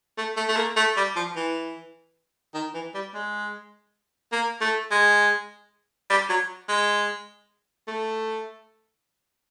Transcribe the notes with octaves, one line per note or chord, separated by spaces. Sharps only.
A3
A3
A3
A#3
A3
G3
F3
E3
D#3
E3
G3
G#3
A#3
A3
G#3
G3
F#3
G#3
A3